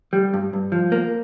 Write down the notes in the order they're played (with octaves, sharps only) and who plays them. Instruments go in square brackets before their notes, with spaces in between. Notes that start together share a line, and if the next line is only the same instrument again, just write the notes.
[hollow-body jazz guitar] G3
G2
G2
F3
A#3